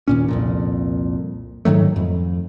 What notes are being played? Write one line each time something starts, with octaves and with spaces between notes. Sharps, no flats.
D#2 A#2 C#4
C2 F2 A#2
G#2 D#3 F#3 A3
F2